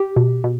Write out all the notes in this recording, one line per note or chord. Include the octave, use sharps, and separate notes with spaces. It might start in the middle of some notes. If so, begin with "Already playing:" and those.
Already playing: G4
B2
B2